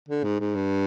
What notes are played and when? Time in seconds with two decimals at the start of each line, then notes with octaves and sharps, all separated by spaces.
0.08 D3
0.24 G#2
0.39 G#2
0.55 G2